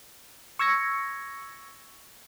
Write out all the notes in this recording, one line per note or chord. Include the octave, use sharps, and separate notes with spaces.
C#6 E6 G#6 A#6 C#7